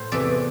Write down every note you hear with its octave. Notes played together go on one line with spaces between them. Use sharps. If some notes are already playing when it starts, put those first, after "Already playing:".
Already playing: A2 C5
E2 C3 E3 A3 D5